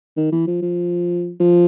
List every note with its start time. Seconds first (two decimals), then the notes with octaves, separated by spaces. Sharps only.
0.17 D#3
0.32 E3
0.47 F3
0.62 F3
1.40 F3